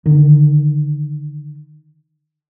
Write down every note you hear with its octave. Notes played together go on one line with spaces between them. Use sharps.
D3 D#3